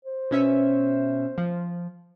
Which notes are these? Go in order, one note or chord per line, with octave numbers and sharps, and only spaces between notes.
C5
B2 C#4 E5
F3